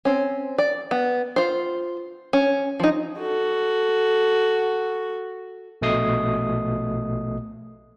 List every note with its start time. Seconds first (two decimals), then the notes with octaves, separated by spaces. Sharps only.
0.05 C4 C#4
0.58 D5
0.91 B3
1.36 F4 C5
2.33 C#4
2.80 F3 D#4
3.19 F#4 A4
5.82 A#1 B2 A3 D#5 D#6 C7